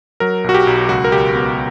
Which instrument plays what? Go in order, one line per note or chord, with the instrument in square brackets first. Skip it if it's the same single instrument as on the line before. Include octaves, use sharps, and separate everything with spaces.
[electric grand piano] F#3 A#4
B1 F#4
G4
B1
C#2 F#4
A#4
C#2 G4
B3